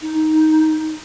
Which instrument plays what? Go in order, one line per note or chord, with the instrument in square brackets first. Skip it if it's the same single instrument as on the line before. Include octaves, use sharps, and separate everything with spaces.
[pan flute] D#4